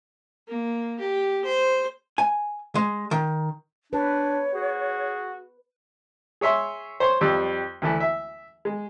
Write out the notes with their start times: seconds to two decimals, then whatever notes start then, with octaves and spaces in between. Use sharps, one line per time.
0.48 A#3
1.00 G4
1.45 C5
2.18 G#5
2.75 G#3
3.11 D#3
3.93 D4 B4 C#5
4.55 F#4 G#4
6.41 G#4 C#5 E5 C6
7.00 C5 C#5 C6
7.21 F2 G3 E6
7.82 D2 E3 A3 E4
8.00 E5
8.65 G#3